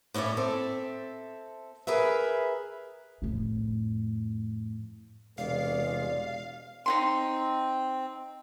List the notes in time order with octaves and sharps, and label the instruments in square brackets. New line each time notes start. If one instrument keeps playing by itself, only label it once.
[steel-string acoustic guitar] A2 C#4 E4 C#5 D5
C4 A4 E5
G#4 A#4 B4 E5
[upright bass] F2 A2
[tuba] E1 [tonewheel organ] C3 G#3 [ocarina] D5 [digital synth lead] F5
[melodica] C4 [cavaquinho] D#4 E4 C6